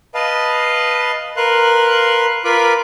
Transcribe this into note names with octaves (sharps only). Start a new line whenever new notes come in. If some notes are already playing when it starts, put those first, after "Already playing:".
B4 D#5 F5 A5
A#4 B4 F5 C6 F#6
F4 A#4 B4 B5 D6